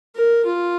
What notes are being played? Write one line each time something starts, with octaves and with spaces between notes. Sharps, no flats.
A#4
F4